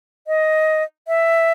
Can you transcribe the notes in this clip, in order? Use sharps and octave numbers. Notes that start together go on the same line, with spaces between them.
D#5
E5